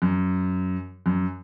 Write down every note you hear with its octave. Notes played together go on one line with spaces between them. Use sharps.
F#2
F#2